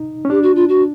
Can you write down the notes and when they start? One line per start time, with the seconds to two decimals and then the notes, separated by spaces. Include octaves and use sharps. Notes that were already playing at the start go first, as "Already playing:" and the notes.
Already playing: D#4
0.25 C#4
0.30 D4 G4
0.43 F#4
0.56 F4
0.69 F#4